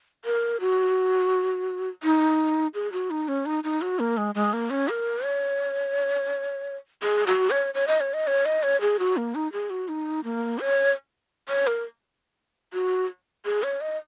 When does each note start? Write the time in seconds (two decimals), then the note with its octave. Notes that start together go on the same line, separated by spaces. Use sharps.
0.25 A#4
0.60 F#4
2.03 D#4
2.74 G#4
2.92 F#4
3.11 D#4
3.28 C#4
3.46 D#4
3.64 D#4
3.82 F#4
3.99 A#3
4.17 G#3
4.35 G#3
4.53 A#3
4.70 C#4
4.89 A#4
5.24 C#5
7.03 G#4
7.27 F#4
7.50 C#5
7.74 C#5
7.87 D#5
8.00 C#5
8.14 D#5
8.27 C#5
8.45 D#5
8.63 C#5
8.81 G#4
8.99 F#4
9.17 A#3
9.35 D#4
9.53 G#4
9.70 F#4
9.88 D#4
10.24 A#3
10.60 C#5
11.49 C#5
11.67 A#4
12.73 F#4
13.45 G#4
13.63 C#5
13.81 D#5